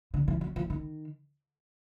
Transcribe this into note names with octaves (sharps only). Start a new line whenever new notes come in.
D3
E3
F#3
F3
D#3